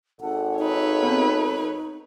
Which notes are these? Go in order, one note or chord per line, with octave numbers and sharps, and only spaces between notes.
G#1 A4 F#5
D#4 B4 C#5
B3 C4